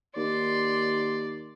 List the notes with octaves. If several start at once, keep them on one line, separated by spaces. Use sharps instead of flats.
D#2 D5 C6